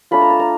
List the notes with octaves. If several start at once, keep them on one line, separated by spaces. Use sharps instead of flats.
A3 D4 F4 B5
A#5
A5
A#5